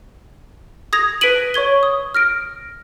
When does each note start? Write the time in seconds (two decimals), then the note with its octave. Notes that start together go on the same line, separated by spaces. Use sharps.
0.93 D#6 G#6 A#6 F7
1.21 B4 B6 D7 D#7 F#7
1.54 C#5 C#6 G#6 G7
1.83 D#6
2.15 F6 A#6 D7